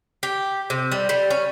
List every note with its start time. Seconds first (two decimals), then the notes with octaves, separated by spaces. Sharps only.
0.23 G4
0.70 C3
0.92 G3
1.09 G3
1.31 C#4